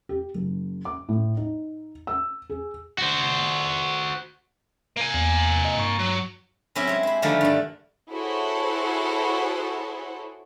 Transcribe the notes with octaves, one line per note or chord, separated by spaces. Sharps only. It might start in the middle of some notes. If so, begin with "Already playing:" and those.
G4
F#1
D6
A2
D#4
E6
G#4
F#4 C5
A#3 G#5
E2
D#5
G2 A#5 C#6
F#3
F#3 C4 C#4 E4 G4
G#3 C4
C5 B5
D3 D#3 F3 G3 A3 A#3
G2 D4
E4 F#4 G#4 A4 C5 C#5